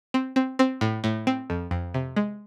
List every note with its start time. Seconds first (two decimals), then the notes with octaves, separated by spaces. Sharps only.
0.14 C4
0.36 C4
0.59 C4
0.81 A2
1.04 A2
1.27 C4
1.50 F2
1.71 F2
1.94 C3
2.16 G#3